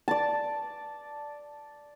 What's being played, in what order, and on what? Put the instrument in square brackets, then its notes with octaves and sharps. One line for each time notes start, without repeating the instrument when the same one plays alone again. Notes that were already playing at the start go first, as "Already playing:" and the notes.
[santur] D5 A5